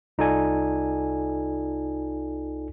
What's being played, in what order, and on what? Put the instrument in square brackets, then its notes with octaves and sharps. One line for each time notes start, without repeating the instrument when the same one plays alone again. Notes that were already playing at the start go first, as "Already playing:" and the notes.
[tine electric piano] C2 D#4 F4 A4 D5 G#5